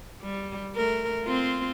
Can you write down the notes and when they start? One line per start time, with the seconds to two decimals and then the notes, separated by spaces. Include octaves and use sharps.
0.23 G3
0.75 A3 A#4
1.24 C4 F4